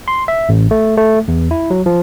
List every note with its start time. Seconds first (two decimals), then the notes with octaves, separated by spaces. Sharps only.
0.08 C6
0.28 E5
0.49 A1
0.71 A3
0.97 A3
1.28 E2
1.51 E4
1.70 F#3
1.86 F3